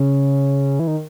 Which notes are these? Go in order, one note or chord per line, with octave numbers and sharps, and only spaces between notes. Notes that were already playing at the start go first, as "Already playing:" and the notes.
Already playing: C#3
E3
D#3